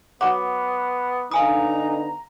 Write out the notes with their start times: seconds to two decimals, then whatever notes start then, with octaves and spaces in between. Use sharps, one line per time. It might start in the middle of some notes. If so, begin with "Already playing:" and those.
0.21 F#3 B3 F#5 D6
1.32 D3 B3 D#4 F5 G#5 A#5 D#6